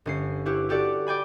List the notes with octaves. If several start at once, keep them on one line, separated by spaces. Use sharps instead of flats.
G1 C#4 C7
E4 G4 B4 C#5
F#4 G4 A4 D5 F#5
D5 G5 G#5 B5